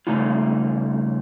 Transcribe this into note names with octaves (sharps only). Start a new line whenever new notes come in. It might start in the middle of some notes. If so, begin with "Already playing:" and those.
G2 C#3 A3 D#4 F4